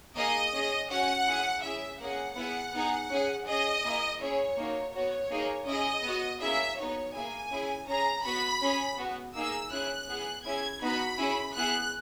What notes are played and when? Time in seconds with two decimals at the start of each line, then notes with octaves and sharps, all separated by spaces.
0.16 A#3 D#4 G#4 D#5
0.53 C#4 G#4
0.90 C#4 F#4 F#5
1.26 C#4 E4 G#4
1.63 C#4 E4 G#4 E5
2.00 A#3 C#4 G#4 F#5
2.36 B3 E4 G#4 F#5
2.74 B3 D#4 G#4
3.10 C#4 G#4
3.47 C#4 G#4 D#5
3.84 A#3 E4 G#4
4.20 C#4 E4 G#4 C#5
4.57 A#3 D#4 F#4
4.93 B3 F#4 C#5
5.31 A#3 D#4 G#4
5.67 C#4 E4 G#4 D#5
6.04 B3 F#4
6.41 A#3 C#4 E4 G#4 E5
6.77 B3 D#4 F#4 C#5
7.14 A#3 E4 G#4 G#5
7.52 C#4 E4 G#4
7.87 C#4 G#4 A#5
8.24 B3 F#4 B5
8.62 C#4 G#4
8.98 B3 F#4
9.35 A#3 D#4 G#4 E6
9.71 C#4 E4 G#4 F#6
10.08 B3 E4 G#4
10.45 C#4 E4 G#4 G#6
10.82 B3 D#4 F#4 B5
11.18 C#4 E4 G#4
11.55 B3 E4 G#4 F#6